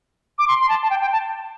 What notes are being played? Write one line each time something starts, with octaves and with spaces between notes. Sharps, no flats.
D6
C6
C6
A5
A5
G5
G5
A5